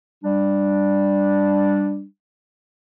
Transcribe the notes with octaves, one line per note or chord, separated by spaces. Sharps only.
G3 D4